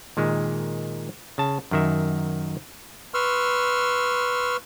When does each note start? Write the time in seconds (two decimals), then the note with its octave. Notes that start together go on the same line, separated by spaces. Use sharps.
0.17 A#2 D#3 G#3
1.38 C#3 A5
1.71 F#2 D#3 E5
3.14 B4 C6 C#6 E6 F6